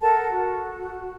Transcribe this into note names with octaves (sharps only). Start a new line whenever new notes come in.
A4 A#4 F#5 A5
F#4